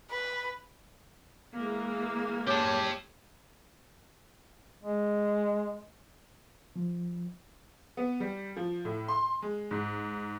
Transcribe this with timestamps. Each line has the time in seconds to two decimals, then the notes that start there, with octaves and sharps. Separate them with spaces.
0.10 B4
1.55 E3 G#3 A#3
2.47 G4 C#5 A5
4.83 G#3
6.76 F3
7.97 B3
8.20 G3
8.57 F3
8.85 A2
9.08 C6
9.42 G#3
9.71 G#2